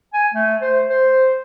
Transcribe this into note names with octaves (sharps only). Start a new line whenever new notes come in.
G#5
A3
C5
C5